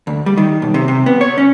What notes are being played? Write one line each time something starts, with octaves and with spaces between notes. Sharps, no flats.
D2
G3
D#3
B1
C3
C3
B3
C#5
C#4